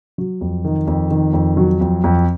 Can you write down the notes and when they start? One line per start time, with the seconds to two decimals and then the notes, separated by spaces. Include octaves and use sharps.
0.18 F#3
0.41 F2
0.65 D#3
0.87 F2
1.11 D#3
1.33 F2
1.57 F#3
1.81 F2
2.04 F2